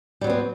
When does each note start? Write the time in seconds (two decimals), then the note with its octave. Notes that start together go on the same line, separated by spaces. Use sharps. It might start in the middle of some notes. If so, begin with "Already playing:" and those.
0.21 G3
0.24 F#3
0.27 B3
0.30 C4